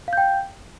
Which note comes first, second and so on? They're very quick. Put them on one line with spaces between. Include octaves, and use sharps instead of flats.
F5 G6 G5